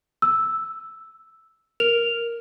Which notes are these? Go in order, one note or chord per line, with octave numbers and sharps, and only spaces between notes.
E6
A#4 F7